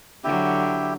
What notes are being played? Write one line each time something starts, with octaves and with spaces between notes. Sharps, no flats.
D3 F#3 E4 G4